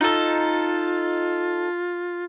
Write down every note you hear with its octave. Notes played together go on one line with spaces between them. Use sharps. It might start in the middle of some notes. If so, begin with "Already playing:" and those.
D#4 F4 A4